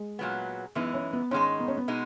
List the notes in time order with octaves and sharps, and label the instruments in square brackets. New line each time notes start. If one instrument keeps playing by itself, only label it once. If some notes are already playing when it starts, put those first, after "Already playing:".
Already playing: [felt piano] G#3
[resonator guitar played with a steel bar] A#2 F#3 B3
[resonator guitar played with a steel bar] F#2 E3 G#3 D#4 [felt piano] B3
[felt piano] C#4
B3
[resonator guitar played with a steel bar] G#2 D#3 G#3 D#4 [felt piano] C#4
[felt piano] B3
C#4
B3
[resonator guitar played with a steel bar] B2 G#3 D#4